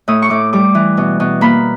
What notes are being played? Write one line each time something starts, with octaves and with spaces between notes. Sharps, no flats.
A2 D#6
C#6
A2 D6
G3 D6
E3
B2
B2
A#3 B5